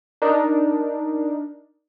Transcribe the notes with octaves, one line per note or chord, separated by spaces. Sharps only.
D4 D#4 A#4